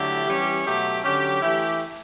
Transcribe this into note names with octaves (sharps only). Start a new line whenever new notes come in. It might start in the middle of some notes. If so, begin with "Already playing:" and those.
Already playing: D3 F#3 A3 E4 G4
E3 G3 C#4
B2 F#3 A3 G4
D3 F#3 C#4 G4
E3 A3 E4 G4